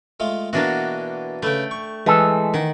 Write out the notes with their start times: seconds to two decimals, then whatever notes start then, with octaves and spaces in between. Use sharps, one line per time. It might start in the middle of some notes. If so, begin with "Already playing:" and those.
0.20 G#3 A3 F4
0.53 B2 E3 A#3 B3 D4 F#4
1.42 C#3 A3 B4 G5
1.71 C#6
2.06 E3 G#3 A4
2.54 D#3 F#5